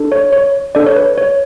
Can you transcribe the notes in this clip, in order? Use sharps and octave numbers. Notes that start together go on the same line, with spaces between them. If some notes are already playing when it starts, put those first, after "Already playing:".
Already playing: D4 A4
C#5
C#5
D4 A4 D5
C#5
B4
C#5